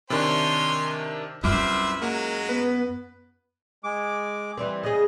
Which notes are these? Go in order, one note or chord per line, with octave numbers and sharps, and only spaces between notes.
C3 D#3 D4 C#5 G#5 C6
C2 F#2 F4 B4 C5 E5 D6 F6
F#3 G#3 A#3
B3 B4
G#3 D6
E3 G3 C4
C#3 G#4 D#5